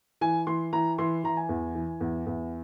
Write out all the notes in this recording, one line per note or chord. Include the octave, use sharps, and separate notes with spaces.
E3 G#5
E3 C6
E3 A#5
E3 C6
E3 A#5
G#5
E2
E3
E2
E2